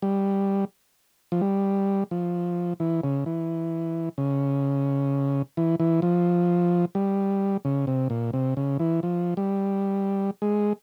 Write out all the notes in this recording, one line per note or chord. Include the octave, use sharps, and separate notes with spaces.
G3
F3
G3
F3
E3
C#3
E3
C#3
E3
E3
F3
G3
C#3
C3
A#2
C3
C#3
E3
F3
G3
G#3